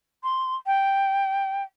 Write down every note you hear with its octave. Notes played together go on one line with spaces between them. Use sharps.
C6
G5